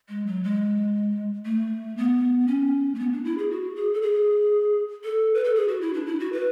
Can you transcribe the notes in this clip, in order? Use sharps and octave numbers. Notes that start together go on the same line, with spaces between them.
G#3
F#3
G#3
A3
B3
C#4
A3
B3
D4
E4
G#4
F#4
G#4
A4
G#4
A4
B4
A4
G#4
F#4
E4
D4
E4
F#4
B4